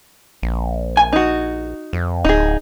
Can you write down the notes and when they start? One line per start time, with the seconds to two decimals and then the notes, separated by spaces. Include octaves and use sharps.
0.42 A#1
0.97 G#5
1.13 D#4 F#4
1.93 F2
2.25 D1 D#4 G#4